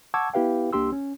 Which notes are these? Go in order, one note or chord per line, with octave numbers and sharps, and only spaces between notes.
F#5 A5 C#6 D6 E6 G#6
B3 E4 G4 B4 F5 G5
C2 A#3 D4 G4 C6 E6
C#4